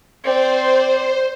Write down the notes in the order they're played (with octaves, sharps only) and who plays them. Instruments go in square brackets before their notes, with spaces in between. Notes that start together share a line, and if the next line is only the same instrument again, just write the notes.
[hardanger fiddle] C4 D5 [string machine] C5